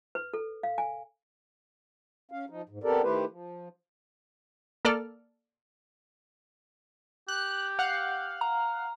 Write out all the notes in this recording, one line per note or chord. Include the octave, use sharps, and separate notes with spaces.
B4
A4
F5
G#5
C#4 F5
F3 D#4
G#2
B3 C4 G4 A4 A#4 D5
D#3 A3 E4 G4 B4 C5
F3
A#3 A4 D5 F6
G4 F#6
F5 F#5 F#6
A#5